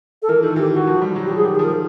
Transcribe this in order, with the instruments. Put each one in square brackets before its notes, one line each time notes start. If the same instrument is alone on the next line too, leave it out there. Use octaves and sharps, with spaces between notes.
[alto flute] A4
[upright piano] E3 [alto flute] A#4
[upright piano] D#3 [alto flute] A4
[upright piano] E3 [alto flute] G4
[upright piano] E3 [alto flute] F#4
[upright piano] F3
G3
[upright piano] F#3 [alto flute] F#4
[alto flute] G4
[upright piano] F3
[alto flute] G#4
[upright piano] D#3 [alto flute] G4
[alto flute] G#4
[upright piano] F3
[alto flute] A#4